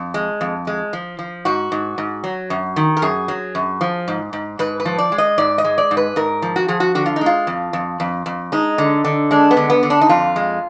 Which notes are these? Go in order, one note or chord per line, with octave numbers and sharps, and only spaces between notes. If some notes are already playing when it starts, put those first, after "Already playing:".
Already playing: F2
G#3
F2
G#3
F3
F3
G#2 F#4
G#2
G#2
F#3
F#2
D#3
A#4
F#2 G#4
F#3
F#2
F3
G#2
G#2
G#2 B4
B4
F3
D5
G#3
D#5
G#2 D5
D#5
G#3
D5
G#2
B4
G#2 A#4
F3
F#4
F3 G#4
F#4
D3 F#4
F4
D#4
G#3 F4
F2
F2
F2
F2
G#3 D#4
D3
D3
G#3 D4
B3
D3
B3
D3
D4
D#4
F2 F4
G#3